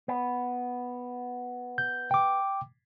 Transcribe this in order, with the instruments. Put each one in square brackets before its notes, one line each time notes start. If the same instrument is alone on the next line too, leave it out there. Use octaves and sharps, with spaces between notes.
[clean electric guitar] B3
[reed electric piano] G6
G5 D6